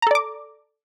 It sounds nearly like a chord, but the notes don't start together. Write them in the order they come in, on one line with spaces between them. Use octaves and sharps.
A#5 A4 D5 D6